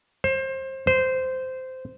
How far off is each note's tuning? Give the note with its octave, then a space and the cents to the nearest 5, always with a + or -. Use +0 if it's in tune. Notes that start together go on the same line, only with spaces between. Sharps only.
C5 +25
C5 -15